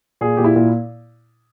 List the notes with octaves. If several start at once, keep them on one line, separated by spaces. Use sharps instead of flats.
A#2 G#4
A#2 G4
E4
A#2